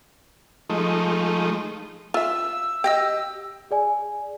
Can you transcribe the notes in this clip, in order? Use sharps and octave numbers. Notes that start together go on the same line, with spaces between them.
F3 G#3 A3 D#4
F4 E5 E6
G4 D#5 G5 E6
G#4 D5 G#5